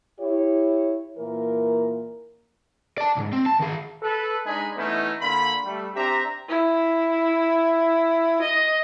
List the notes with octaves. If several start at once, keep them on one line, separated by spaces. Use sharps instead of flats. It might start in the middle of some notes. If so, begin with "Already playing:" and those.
E4 G4 C#5
A#2 E3 A#4
D5 A5
B1 G#2
C4
A5
D#3 G#4
A4 B4
G#3 D4 D#4 G#4 G#5 B5
E3 A3 B3 C#4 D#4 E4
D3 A#3 F4 B5
G3 A3
C4 D4 G4 E5 A#5
E4
D#5